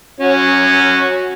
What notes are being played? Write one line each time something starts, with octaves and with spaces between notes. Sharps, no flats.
C#4 F#4